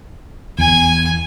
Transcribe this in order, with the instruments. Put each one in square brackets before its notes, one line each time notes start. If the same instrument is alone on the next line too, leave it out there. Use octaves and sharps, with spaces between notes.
[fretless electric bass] E2 [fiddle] G#5